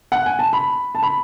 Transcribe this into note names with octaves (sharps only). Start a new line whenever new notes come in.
F#5
G#5
A5
B5
A5
B5